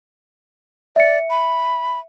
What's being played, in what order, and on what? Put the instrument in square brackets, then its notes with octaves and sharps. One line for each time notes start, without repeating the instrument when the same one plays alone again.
[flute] D5 [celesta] E5 C#7
[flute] B5